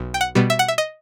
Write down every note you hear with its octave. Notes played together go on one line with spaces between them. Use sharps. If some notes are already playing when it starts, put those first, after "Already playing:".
Already playing: B1
G5
F#5
B2 G3 B3
E5
F#5
E5
D#5